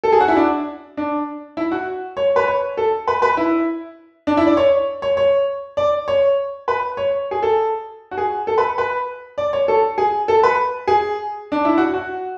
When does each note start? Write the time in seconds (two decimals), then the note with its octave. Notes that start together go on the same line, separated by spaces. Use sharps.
0.04 A4
0.12 G#4
0.20 F#4
0.28 E4
0.37 D4
0.97 D4
1.57 E4
1.72 F#4
2.17 C#5
2.36 B4
2.47 C#5
2.77 A4
3.08 B4
3.22 B4
3.37 E4
4.27 D4
4.37 E4
4.47 D5
4.57 C#5
5.02 C#5
5.17 C#5
5.77 D5
6.08 C#5
6.68 B4
6.97 C#5
7.31 G#4
7.43 A4
8.11 F#4
8.18 G#4
8.47 A4
8.58 B4
8.78 B4
9.38 D5
9.53 C#5
9.68 A4
9.98 G#4
10.28 A4
10.43 B4
10.88 G#4
11.52 D4
11.65 E4
11.78 F#4
11.94 F#4